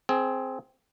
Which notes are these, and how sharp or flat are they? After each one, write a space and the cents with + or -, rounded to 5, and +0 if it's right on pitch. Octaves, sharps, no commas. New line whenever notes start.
C4 +0 G#4 +20